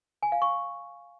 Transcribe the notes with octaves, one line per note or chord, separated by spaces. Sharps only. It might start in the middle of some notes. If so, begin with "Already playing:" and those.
G#5
F5
C#6